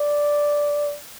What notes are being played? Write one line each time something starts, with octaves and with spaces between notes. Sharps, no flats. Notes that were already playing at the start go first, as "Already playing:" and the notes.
Already playing: D5